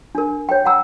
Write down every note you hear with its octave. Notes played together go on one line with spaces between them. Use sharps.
D4 A#4
C#5 G5
F#5 G5 A#5 E6